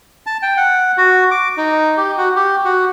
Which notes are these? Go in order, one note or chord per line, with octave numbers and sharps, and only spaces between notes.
A5
G5
F#5
F#4
D6
D#4
G4
F#4
G4
F#4